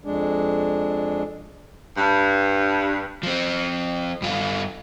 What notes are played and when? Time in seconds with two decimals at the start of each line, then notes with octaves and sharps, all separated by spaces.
0.04 F2 G#3 D4
1.97 G2
3.23 F3 C4
4.22 G2 F4